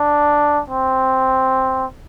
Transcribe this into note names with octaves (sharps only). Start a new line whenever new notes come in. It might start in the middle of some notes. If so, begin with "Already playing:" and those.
Already playing: D4
C4